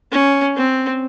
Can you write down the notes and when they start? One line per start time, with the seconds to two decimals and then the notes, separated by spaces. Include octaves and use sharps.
0.12 C#4
0.57 C4